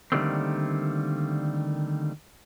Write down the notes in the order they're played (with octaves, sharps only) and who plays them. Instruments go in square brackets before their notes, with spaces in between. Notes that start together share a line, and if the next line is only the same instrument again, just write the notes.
[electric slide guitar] D3 D#3 G3 A3 A#3 C4